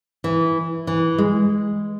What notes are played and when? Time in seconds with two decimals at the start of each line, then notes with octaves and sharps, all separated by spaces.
0.24 E3
0.87 E3
1.18 G#3